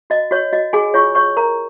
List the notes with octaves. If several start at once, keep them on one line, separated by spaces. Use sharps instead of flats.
F#4 D#5
F#4 C#5
F#4 D#5
F#4 G#4 G#5
F4 C#5 C#6
C#5 C#6
A#4 C#5 A#5